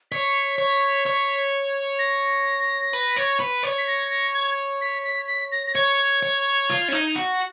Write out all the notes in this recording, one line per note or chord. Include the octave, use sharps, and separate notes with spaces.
C#5 B6
C#5
C#5
A#6
B4
C#5
B4
C#5
B6
A#6
A#6
G#6
B6
B6
B6
A#6
A#6
C#5 G#6
C#5
F4
C#4
D#4
F#4